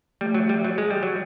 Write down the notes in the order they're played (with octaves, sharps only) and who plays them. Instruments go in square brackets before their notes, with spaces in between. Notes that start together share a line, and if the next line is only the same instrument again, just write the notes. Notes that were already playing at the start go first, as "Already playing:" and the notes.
[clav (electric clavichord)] G3 [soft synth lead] A3
[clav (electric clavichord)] F#3
G3
F#3
G#3
G3
F#3